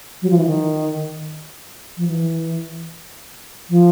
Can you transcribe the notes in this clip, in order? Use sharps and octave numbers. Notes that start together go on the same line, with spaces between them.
F#3
F3
E3
D#3
F3
E3
F3